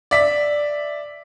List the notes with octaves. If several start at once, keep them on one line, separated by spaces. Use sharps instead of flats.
D5 E5 B6